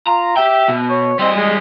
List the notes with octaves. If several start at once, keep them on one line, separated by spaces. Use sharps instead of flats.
F4 A#5
G4 E5 G5
B2
C#5
G3 C4 D#5
G#3